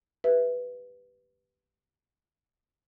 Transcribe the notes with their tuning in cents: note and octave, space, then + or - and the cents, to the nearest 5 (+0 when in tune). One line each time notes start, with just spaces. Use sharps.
G4 +0 B4 +0 E5 +0